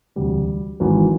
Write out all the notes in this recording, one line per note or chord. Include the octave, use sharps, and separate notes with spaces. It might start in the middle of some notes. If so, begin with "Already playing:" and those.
E1 D2 C3 G3
G#1 G#2 E3 F#3